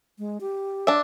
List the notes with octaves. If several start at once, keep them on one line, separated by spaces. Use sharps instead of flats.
G#3
G4
D4 E5